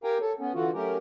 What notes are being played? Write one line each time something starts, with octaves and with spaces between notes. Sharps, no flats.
G4 A#4 F5 G5 G#5 A#5
A4 C#5
B3 C#4
D3 E3 F4 F#4
F#3 A3 C#4 G4 A#4